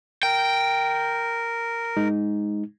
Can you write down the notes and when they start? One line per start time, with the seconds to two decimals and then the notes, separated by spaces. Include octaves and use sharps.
0.23 A#4 G5
1.97 G#3 D#4